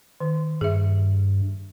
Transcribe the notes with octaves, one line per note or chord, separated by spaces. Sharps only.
D#3
G2 G#4 E5